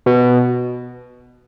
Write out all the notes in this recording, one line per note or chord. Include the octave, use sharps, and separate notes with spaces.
B2